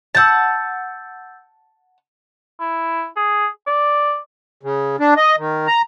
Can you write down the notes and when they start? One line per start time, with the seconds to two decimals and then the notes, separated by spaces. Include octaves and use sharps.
0.15 F#5 A5 E6 G6 A6
2.60 E4
3.17 G#4
3.67 D5
4.63 C#3
5.00 D4
5.17 D#5
5.38 D#3
5.67 A#5